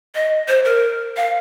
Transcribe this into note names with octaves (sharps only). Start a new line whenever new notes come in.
D#5
C5
A#4
F5